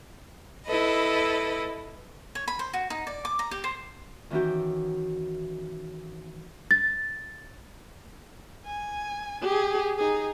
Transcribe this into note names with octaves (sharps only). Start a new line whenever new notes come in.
E4 A4 B4 D#5
C#5
B5
C5
F#4
D#4
D5
D6
A#5
G4
C5
D#3 E3 C#4 E4 F#4 G4
A6
G#5
G4 G#4
D#4 G#4